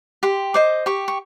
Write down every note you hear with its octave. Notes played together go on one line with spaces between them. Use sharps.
G4 C6
C5 D#5 D6
G4 C#6
C#6